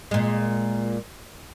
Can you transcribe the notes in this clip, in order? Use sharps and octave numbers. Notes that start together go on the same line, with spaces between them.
A#2 G#3